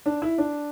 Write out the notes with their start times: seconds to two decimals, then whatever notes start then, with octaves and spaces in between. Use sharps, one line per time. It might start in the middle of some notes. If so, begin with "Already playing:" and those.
0.06 D4
0.22 E4
0.38 D4